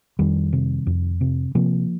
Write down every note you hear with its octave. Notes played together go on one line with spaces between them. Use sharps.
F2 D#3 G3
C3
F2
C3
C3 F3 A#3